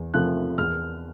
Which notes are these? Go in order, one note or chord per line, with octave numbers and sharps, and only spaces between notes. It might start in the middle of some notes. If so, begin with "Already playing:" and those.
Already playing: E2
C3 F3 A3 F#6
E2 F6